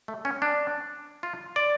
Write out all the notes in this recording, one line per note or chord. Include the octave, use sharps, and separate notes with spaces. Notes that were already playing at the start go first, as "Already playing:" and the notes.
A3
C#4
D4
F4
D5